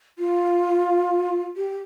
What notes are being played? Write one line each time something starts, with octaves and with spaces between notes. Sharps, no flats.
F4
G4